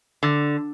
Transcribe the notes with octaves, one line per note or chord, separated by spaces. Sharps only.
D3